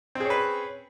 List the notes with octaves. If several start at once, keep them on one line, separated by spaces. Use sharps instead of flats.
C4 C#4 G#4 B4